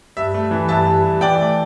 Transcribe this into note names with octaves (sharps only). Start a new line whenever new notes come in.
G2 E5
A3
E3
G2 E5 A5
G2
G2
E3 D5 G5
A3